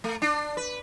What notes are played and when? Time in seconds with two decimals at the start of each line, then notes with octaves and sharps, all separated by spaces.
0.04 A3
0.22 D4
0.57 B4